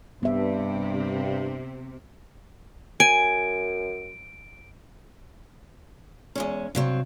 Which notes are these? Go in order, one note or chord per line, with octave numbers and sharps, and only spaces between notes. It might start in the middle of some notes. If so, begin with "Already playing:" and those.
G2 C3 B3 E5
F#2 G#5 D7
E2 G#3 C#4
G2 C3 F#3 C4